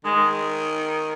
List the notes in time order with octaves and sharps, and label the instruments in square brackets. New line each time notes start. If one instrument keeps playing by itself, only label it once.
[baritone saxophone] D#3 [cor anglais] G#3